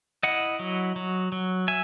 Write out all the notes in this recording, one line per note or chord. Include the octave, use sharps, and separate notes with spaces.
E4 D#5 F#5
F#3
F#3
F#3
E5 G#5